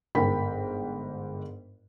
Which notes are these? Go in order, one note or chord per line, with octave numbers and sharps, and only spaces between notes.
G1 G#2 A#4 G5 B5 B6